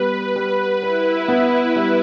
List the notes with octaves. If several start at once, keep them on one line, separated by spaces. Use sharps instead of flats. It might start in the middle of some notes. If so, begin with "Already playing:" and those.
Already playing: G3 B3 B4
G3 B4
E4 B4
B3
G3